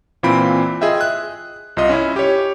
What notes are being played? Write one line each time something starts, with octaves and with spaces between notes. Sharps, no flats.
A#2 E3 C4 F4 B5 D7
F4 G#4 D#5 E5 G5
F#6
C2 F4 D#5
C#4 E4
G4 C#5